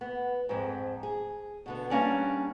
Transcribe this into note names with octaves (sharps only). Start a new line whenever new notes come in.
B3
F2 G#2
G#4
B2 D3 B3
G3 A#3 C#4 D4